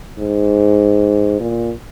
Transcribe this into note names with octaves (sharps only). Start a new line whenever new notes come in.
G#2
A#2